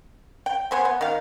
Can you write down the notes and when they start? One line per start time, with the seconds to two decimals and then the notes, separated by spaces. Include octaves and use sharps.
0.46 G5
0.71 B3 C5 G#5
0.85 B3
1.01 D#3 F5